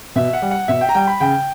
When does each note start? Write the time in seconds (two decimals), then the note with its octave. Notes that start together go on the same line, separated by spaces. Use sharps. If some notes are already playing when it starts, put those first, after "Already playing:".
0.16 B2 E5
0.33 F#5
0.42 G3
0.51 F#5
0.68 B2 E5
0.81 G5
0.89 A#5
0.95 G3 G5
1.07 B5
1.20 C#3 G5